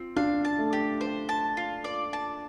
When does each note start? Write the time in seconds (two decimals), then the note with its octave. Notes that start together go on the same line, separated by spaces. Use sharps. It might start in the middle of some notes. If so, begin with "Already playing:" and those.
Already playing: C4 F4
0.16 D4 F5
0.45 A5
0.59 A3
0.73 G4
1.01 C5
1.29 A5
1.57 F4
1.84 D5
2.13 A5